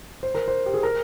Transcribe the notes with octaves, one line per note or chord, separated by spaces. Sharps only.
C5
A#4
C5
G4
G#4
A#4